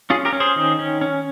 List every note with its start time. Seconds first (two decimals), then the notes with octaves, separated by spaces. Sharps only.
0.10 C#4 F4 G#4
0.25 G4 A#4
0.32 C#4
0.40 G#4 C5
0.56 D#3
0.79 C#4
1.01 C#4